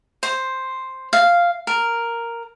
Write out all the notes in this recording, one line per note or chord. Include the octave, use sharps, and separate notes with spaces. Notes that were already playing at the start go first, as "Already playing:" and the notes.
C5
F5
A#4